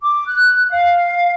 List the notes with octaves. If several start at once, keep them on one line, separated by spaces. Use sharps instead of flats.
D6
F#6
F5